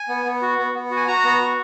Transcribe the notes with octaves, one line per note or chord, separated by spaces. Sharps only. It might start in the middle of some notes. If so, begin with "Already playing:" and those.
Already playing: G#5
B3
B3
F#4
B3
B3
F#4
G#5
F#4 A#5
B3
F#4